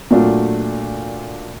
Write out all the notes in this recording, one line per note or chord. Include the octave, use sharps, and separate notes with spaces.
A#2 F#3 A3 D4 F4